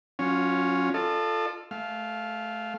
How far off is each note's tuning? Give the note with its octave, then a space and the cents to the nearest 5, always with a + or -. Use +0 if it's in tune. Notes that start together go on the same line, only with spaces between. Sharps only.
F#3 -20 C#4 +0 F4 +5
F4 +0 A4 +0 D#5 -45
A3 -25 F5 +0